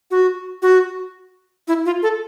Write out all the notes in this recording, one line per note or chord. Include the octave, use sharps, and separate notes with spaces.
F#4
F#4
E4
F4
A4